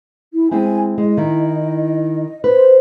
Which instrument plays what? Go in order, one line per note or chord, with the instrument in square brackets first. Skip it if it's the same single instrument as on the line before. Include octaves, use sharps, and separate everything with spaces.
[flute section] E4
[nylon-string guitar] G#3 C4 E4 [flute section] G#5
[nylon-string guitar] G#3 [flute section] D#5
[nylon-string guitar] D#3 E4
[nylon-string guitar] B4 [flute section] C5